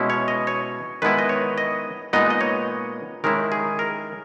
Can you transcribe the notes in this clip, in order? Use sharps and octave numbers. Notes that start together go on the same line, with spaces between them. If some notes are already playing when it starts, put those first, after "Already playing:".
Already playing: B2 G#3 C#4 E4
C#5
D#5
C#5
D#3 G#3 B3 E4 B4
D#5
C#5
D#5
A#2 G#3 B3 D#4 D#5
D#5
C#5
D#3 G#3 C#4 E4 A#4
G#4
A#4